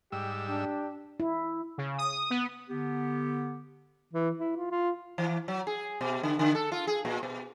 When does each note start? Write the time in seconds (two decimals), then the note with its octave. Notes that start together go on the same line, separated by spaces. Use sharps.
0.12 G#2 G3 G4 E6
0.47 D4
1.20 E4
1.78 C#3
1.98 D#6
2.30 B3
2.69 D3 B3 G4
4.13 E3
4.39 E4
4.57 F4
4.71 F4
5.18 E3
5.48 F#3
5.67 G#4
6.01 B2
6.23 D3
6.39 D3
6.55 A4
6.72 F4
6.87 G#4
7.05 A#2
7.23 B2